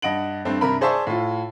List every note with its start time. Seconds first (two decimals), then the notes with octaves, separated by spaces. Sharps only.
0.02 G2 D#5 F#5 D7 F#7
0.45 G2 A3 C4
0.61 G2 C3 A#4 B5
0.81 G#4 C5 D5 E5 A5 C#6
1.07 A2 F4